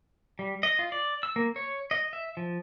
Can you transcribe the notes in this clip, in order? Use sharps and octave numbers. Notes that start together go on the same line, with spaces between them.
G3
D#5
F4
D5
E6
A#3
C#5
D#5
E5
F3